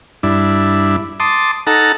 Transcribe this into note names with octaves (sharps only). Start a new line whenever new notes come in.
G2 D4 E4
A5 C6 D6 D#6
D#4 A4 F#5 A5 A#5